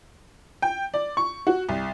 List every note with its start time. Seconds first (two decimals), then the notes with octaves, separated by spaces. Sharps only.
0.62 G5
0.94 D5
1.17 C#6
1.47 F#4
1.69 C2